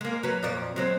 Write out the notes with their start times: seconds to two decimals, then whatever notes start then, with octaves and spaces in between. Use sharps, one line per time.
0.01 G#3 A#3
0.23 F#3 B4
0.43 F2 A#2 D5
0.76 F#3 G#3 C4